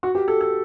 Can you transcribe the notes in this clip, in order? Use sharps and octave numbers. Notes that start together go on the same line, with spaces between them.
F#4
G4
A4
A4